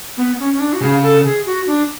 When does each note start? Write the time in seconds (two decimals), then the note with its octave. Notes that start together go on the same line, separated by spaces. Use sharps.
0.17 B3
0.39 C#4
0.54 C#4
0.60 D4
0.73 F#4
0.81 C#3 G#4
1.03 A4
1.25 G#4
1.46 F#4
1.67 D4